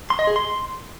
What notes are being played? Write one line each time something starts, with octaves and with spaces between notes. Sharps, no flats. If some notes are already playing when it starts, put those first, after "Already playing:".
C6
D#5
G#4
C6